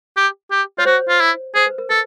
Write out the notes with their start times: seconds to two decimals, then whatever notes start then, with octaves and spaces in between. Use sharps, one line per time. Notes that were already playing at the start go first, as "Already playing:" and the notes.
0.17 G4
0.51 G4
0.78 F4 C#5
0.85 F#4 C5
1.09 F4
1.20 E4
1.55 G#4 C5
1.67 B4
1.78 A#4
1.90 A4 B4